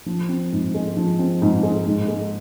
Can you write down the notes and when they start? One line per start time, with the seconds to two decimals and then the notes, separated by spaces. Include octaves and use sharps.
0.06 F3
0.29 C4
0.52 G#2
0.74 G#3
0.97 F3
1.19 C4
1.42 G#2
1.63 G#3
1.86 G#2
2.08 G#3